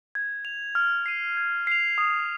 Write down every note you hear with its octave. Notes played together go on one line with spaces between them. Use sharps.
G#6
F7
F6
C7 D#7
G#6
C7 F7
D#6